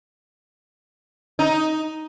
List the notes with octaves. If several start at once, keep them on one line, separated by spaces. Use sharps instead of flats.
D#4